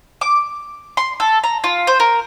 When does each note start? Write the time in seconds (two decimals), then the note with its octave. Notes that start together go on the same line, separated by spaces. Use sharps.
0.21 D6
0.97 C6
1.20 A4
1.44 A#5
1.64 F4
1.87 C5
2.00 A#4